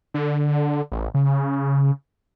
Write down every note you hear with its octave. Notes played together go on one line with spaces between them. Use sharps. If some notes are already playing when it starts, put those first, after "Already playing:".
D3
A1
C#3